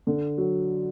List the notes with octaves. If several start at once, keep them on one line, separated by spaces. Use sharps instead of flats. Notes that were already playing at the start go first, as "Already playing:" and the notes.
D3
F#3